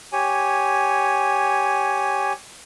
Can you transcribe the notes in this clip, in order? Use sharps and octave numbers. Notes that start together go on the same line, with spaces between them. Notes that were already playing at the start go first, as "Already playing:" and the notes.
G4 C#5 G#5